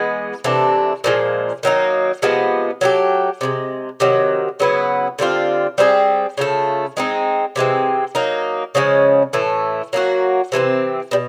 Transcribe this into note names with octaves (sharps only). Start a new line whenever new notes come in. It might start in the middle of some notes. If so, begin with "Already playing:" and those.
Already playing: E3 G#3 B3
C3 E3 A3 D4
A#2 F3 G#3
D#3 F#3 A#3 D#4
C3 F3 G#3 B3
F#3 A3 D4 G4
C3 E3 G#3
C3 D#3 F#3
C#3 F#3 B3 E4
D3 G3 C4 F4
G3 C4 E4 G#4
C#3 F3 A3
G#3 C4 D#4
C3 E3 G#3 C4
F#3 A#3 D#4
C#3 F3 G#3 C#4
A2 E3 A3
F#3 A#3 D#4 F#4
C3 E3 A3 C4
B2 G3